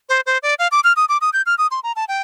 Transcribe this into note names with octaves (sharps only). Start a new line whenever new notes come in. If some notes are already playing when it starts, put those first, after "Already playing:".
C5
C5
D5
F5
D6
F6
D#6
D6
D#6
G6
F6
D#6
C6
A#5
A5
G5